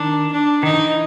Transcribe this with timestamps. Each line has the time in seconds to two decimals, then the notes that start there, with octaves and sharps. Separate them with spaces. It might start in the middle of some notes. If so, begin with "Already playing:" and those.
Already playing: D#3 D4
0.32 D4
0.63 D#3 D#4
0.74 D#3
0.77 E3